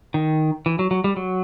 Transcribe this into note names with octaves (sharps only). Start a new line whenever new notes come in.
D#3
E3
F#3
F#3
G3
F#3